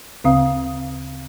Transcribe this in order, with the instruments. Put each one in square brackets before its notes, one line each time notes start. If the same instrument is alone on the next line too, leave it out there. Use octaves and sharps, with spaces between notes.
[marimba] D2 C#3 C4 F5 D#6